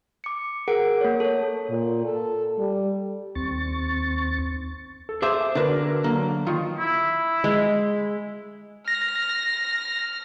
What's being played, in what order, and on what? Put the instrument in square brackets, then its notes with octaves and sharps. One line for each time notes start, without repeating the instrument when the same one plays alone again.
[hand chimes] D6 C#7
G#4 A#4 F#5 D7
A#3 C#5
A4 C#5
[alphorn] A#2
A4
G3
[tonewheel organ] D#2 C4 C#6 A6
[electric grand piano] A4
[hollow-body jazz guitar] G#4 C5 E5 [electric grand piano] D6
[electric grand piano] D3 F#4 A#4 [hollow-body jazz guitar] D4 B4
[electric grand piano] D3 F#3 [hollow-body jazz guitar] A#3
[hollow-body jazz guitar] D#3 [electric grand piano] F4
[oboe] E4
[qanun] G#3
[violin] F6 [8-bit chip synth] A#6